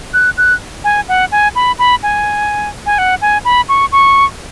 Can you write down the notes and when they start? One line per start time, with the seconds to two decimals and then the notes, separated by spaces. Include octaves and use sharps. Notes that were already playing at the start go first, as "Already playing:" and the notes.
0.14 F#6
0.38 F#6
0.84 G#5
1.09 F#5
1.32 G#5
1.55 B5
1.79 B5
2.03 G#5
2.86 G#5
2.98 F#5
3.22 G#5
3.45 B5
3.69 C#6
3.92 C#6